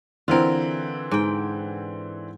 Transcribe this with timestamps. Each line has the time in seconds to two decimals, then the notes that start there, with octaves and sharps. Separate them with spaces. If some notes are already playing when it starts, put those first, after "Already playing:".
0.28 D3 E3 C4 F4 A#4
1.11 G#2 G5